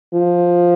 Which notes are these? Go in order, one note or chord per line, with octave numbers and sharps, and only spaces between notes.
F3